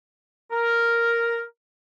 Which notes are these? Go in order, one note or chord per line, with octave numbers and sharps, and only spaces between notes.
A#4